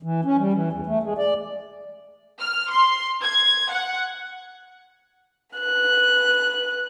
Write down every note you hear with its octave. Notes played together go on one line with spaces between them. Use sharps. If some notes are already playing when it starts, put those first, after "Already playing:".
E3
C#4
G3
E3
E2
A3
G#3
D5
F6
C6
G#6
F#5
B4 F#6